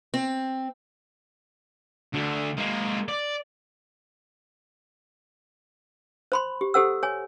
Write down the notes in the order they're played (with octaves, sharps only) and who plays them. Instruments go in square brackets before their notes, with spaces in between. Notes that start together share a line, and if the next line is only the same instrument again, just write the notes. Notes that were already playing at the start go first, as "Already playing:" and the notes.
[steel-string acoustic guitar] C4
[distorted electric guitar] D2 D3
G#3 A#3
D5
[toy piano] C5 B5 C6
G4
G4 A4 C5 F#5 E6
C#5 G#5